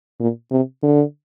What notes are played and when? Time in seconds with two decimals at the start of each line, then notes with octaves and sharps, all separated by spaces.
0.20 A#2
0.51 C3
0.83 D3